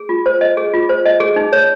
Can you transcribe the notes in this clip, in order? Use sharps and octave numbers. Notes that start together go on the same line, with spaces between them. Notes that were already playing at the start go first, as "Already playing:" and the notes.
Already playing: G#4
F4
C5
D#5
G#4
F4
C5
D#5
G#4
D#4
C#5